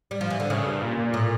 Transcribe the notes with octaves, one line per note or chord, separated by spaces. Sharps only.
G3
F3
E3
D3
A2 C#3
G2
A#2
A#2
A2